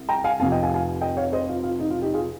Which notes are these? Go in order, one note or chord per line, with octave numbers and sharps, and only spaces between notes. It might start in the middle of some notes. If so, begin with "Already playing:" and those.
Already playing: C2
G5 A#5
F5 G#5
F1 F2 C3 F3 F5 G#5
D#5 G5
F5 G#5
F5 G#5
D#5 G5
C#5 F5
C5 D#5
F4
F4
D#4
F4
D#4 G4
F4 G#4